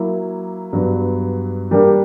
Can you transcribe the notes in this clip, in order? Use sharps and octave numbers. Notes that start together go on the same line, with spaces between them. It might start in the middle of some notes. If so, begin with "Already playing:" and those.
Already playing: F#3 A#3 E4
G2 F#3 B3
G3 A#3 D4 G4 A#4